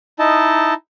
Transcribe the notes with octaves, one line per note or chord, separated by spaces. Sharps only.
D#4 E4 D#5 A5